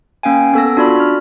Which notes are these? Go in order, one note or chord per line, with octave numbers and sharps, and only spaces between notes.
A#3 C#4 F5 G5 G#5
B3 A4 E6 A#6
D4 F4 F#4 D5 B5
F6